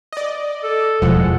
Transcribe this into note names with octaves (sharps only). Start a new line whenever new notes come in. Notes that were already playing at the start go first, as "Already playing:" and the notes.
D5 D#5
A4
E1 A2 F3 G#3 F#5